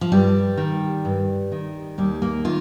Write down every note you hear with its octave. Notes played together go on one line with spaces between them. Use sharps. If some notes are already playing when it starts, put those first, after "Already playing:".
F3
G2 G3
D#3
G2
D#3
D#2 G3
A#3
D#3 F4